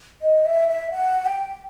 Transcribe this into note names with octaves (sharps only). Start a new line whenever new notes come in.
D#5
E5
E5
F#5
G5